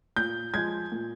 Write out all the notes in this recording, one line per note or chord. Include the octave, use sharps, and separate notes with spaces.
A#2 G6
F3 G#3 G#6
A#2